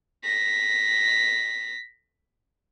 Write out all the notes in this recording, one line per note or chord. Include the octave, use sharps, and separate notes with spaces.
A#6 B6